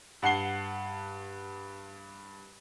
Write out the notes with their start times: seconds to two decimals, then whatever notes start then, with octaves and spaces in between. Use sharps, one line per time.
0.22 G2 F#5 A5 C7 G7